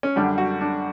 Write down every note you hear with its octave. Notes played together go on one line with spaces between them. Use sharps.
C#4
F#2 D3 G3 D4
F#4
D4